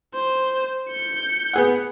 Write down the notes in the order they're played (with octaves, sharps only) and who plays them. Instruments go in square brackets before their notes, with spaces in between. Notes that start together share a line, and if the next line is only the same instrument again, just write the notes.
[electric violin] C5
G6 C#7
[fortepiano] B3 G#4 F#5